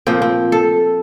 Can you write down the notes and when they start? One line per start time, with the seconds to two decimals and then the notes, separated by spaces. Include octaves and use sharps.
0.07 A#2 F3 C4
0.22 C4
0.52 A4